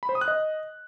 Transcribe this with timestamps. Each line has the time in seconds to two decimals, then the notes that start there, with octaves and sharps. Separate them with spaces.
0.03 B5
0.09 C5
0.15 D#6
0.21 F#6
0.28 D#5